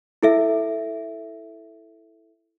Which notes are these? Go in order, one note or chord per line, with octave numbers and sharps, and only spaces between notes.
E4 A4 E5